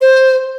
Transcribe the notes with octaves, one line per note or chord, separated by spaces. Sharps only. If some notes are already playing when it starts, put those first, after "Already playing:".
C5